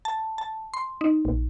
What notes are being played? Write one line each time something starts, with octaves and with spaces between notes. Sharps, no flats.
A5
A5
C6
D#4
A#1